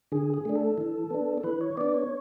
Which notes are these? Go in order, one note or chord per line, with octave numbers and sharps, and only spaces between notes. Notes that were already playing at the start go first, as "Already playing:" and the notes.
D3 G#4
G#4
A3 D4
A4
E3
B3 D4
A4
E3 B4
C#5
B3 D4 D5
C#5